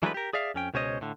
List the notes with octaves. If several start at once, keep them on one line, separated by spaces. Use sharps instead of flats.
E3 F#3 G#3 A3 D4 B4
G4 A#4
G#4 D5 E5 F5
F2 C#4 G5
C#2 B2 C#4 C5 C#5 D#5
A2 D3